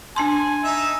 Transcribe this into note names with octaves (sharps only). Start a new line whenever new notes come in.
D4 G#5 A5 C6
D#4 E5